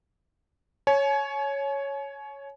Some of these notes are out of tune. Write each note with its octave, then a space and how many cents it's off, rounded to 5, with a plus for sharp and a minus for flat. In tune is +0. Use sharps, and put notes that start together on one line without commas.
C#5 +0 G#5 +40